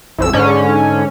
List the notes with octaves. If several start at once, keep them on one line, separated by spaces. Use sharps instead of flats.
A1 F2 E6
G#2 D3 C#4